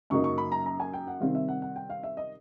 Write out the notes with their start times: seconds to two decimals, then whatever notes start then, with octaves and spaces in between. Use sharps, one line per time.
0.10 F#2 C#3 F#3 A#3 D#4 C#6
0.24 C#6
0.38 B5
0.52 A#5
0.66 A#5
0.80 G#5
0.93 G5
1.07 F#5
1.21 C3 D#3 G3 C4 F5
1.35 E5
1.48 F#5
1.62 F#5
1.76 G5
1.90 F5
2.03 E5
2.17 D#5